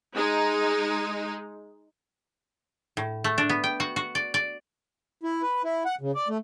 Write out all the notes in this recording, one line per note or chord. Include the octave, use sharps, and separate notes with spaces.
G#3 D#4
A2
A3
D4
B3
G5
F#4
F#4
D5
D5
E4
B4
E4
F#5
C#3
D5
A3